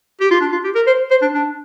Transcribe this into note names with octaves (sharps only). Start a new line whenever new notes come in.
G4
F4
D4
F4
G4
A#4
C5
C5
D4
D4